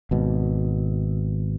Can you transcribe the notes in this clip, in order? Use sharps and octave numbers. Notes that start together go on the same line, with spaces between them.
G#1 B2